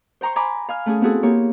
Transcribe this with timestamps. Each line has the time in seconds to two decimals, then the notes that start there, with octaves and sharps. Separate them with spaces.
0.21 C5 G5 A#5 C6 C#6
0.36 G#5 A#5 B5 D6
0.69 F5 G#5 F6
0.86 A3 C#4 G#4
1.01 B3 C4 E4 F#4 G#4 A4
1.23 A#3 G4 C#5